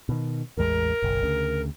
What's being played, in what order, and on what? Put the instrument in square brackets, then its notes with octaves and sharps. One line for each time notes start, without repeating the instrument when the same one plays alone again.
[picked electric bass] B2 D#3
[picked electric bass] A1 E2 G#3 [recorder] A#4
[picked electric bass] F#1 B1
D2 C#3